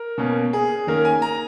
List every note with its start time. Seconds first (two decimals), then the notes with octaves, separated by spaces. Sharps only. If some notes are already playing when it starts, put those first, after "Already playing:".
Already playing: A#4
0.18 B2 A#3 C#4
0.53 G#4
0.87 D#3 A#3 C#4 A#4
1.05 G#5
1.22 A#5